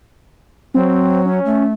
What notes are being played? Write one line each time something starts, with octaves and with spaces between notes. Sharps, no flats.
F#3 C4
C#4
A3